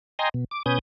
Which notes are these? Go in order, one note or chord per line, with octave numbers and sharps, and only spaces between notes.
D#5 G5 G#5 A#5 C6
B2
D6
B2 C#4 B4 G#5 D#6 G6